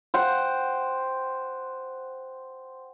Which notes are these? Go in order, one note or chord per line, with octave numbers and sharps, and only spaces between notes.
C5 F#5 G5